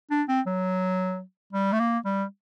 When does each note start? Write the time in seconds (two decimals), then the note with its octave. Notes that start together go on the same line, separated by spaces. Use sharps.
0.10 D4
0.28 C4
0.46 F#3
1.53 G3
1.73 A3
1.80 A#3
2.05 G3